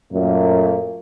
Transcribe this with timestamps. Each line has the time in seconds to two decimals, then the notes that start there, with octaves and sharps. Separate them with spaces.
0.12 F#2 A#2 A3 A#3